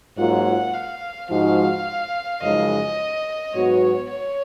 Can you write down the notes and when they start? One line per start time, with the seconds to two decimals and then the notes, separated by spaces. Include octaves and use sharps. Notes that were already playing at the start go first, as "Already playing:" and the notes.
0.18 G#2 F#3 A#3 F4 F#5
0.73 F5
1.30 G#2 F3 G#3 D#4 F#4 F5
2.42 F#2 C#3 F3 G#3 D#4 D#5
3.54 G#2 F#3 B3 F#4 C#5
4.09 C#5